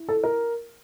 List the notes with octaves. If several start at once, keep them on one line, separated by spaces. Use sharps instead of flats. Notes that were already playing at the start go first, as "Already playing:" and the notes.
Already playing: E4
A4
A#4